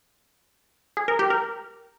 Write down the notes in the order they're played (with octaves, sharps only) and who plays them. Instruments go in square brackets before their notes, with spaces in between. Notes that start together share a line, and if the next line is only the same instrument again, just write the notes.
[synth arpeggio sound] G#4
A#4
G4
A#4